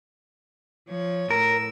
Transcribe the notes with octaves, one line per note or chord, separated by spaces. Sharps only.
F3 C#5
A2 A#4 E6